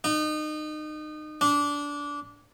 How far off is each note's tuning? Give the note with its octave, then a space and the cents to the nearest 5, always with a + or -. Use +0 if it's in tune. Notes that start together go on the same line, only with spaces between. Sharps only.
D#4 -30
D4 -20